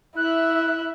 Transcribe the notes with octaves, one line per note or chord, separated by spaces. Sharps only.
E4 E5 F#6